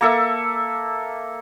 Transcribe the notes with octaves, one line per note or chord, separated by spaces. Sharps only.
A#3 A4 E5